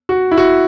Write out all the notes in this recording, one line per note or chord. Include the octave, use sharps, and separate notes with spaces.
F#4
E4
F#4